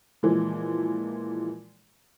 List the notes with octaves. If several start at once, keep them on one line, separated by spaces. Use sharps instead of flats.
A#2 E3 F3 G#3